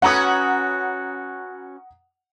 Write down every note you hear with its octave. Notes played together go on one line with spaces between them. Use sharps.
C#4 F#4 B4 F#5 A#5 D#6